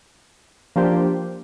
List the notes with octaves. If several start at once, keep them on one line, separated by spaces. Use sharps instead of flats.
F3 A#3 D4 G4 C5